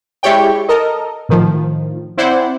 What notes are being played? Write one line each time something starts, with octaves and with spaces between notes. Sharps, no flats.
G#3 E4 G4 C#5 D5 G5
A4 A#4 D#5
A2 D#3 F3
C4 E4 C5 D5 F#5